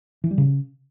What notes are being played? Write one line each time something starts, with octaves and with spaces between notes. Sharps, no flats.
E3
G3
C#3